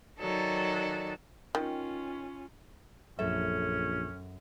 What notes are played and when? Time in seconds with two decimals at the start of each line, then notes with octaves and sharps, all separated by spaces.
0.19 D#3 F#3 A4 D5
1.55 D#3 C#4 F4
3.19 A#1 F#2 C#4 A4 E5